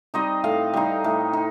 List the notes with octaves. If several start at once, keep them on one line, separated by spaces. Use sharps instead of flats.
G3 C4 D#4 D#5
A2 F5
G3 C4 D#4
A2
D#4